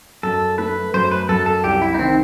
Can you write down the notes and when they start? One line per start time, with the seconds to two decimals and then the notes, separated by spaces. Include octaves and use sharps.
0.23 F#2 A4
0.58 A3 B4
0.94 F#2 C5
1.11 B4
1.29 F#2 A4
1.46 A4
1.64 C2 G4
1.82 E4
1.94 D#4
1.99 D#3 C4